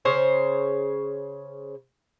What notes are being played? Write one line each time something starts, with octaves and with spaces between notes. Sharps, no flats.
C#3 C5 C#5